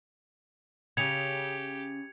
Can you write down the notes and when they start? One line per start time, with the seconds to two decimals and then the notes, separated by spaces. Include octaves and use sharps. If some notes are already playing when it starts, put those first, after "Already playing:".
0.97 C#3 G4 G#6 C#7 F7